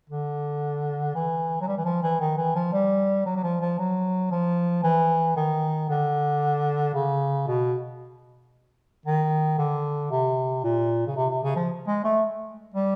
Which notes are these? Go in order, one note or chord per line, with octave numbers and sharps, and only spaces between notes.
D3
E3
F#3
G3
E3
F3
E3
D#3
E3
F3
G3
F#3
F#3
F3
F3
F#3
F3
E3
D#3
D3
C#3
B2
D#3
D3
C3
A#2
C#3
C3
C3
C#3
F3
G#3
A3
G3